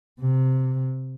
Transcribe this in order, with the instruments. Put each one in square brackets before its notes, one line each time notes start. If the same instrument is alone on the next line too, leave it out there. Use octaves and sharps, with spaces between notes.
[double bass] C3